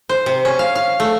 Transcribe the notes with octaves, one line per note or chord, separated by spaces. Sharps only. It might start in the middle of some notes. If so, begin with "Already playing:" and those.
C5
C3
C#4
F5
F5
A3